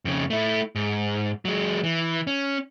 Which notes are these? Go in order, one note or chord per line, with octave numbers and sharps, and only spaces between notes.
F2 C#3
A3 E4
G#2
F#3 G#3
E3
C#4